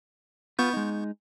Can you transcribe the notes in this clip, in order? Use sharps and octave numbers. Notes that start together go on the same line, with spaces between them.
B3 F4 B4 C#6 G6
G#3 D#4